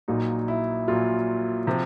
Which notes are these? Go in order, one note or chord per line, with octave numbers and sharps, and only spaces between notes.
A#1 A#2 F#3 D#4
E4
A#1 A#2 F#3 F4
C3 F3